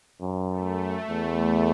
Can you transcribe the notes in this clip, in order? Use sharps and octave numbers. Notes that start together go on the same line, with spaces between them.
F#2
A3
E2